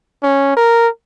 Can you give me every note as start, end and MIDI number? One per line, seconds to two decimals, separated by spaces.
0.23 0.52 61
0.57 0.88 70